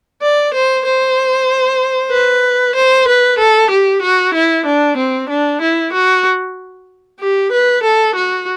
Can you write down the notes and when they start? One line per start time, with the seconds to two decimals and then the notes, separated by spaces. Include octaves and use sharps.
0.22 D5
0.54 C5
0.86 C5
2.12 B4
2.76 C5
3.08 B4
3.39 A4
3.71 G4
4.03 F#4
4.35 E4
4.66 D4
4.98 C4
5.30 D4
5.62 E4
5.93 F#4
7.20 G4
7.52 B4
7.83 A4
8.16 F#4